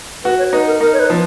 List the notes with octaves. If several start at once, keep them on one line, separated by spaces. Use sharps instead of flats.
F#4 B4
C#5
D#4 B4
A#4
D#4 A#4
C#5
B4
F3